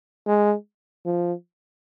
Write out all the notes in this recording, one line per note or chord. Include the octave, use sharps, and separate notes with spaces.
G#3
F3